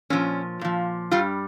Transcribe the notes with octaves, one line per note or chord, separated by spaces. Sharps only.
A#2 F3 C#4
A#2 F3
G2 G3 F4